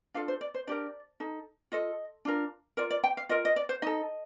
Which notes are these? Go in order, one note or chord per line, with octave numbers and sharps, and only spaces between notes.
D4 F4 A4 F5
C5
D5
C5
D4 G4 A#4 D5
D#4 A4
F4 A4 D#5
D4 F4 A#4
F4 A#4 D5
D5
G5
F5
F4 A#4 D#5
D#5
D5
C5
D#4 A4 D#5